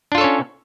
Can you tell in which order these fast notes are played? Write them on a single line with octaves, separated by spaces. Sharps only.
D4 F4 A4 C#5 C#4